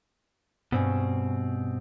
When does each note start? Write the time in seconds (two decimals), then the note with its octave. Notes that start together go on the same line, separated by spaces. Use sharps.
0.72 G2 B2 C4 C#4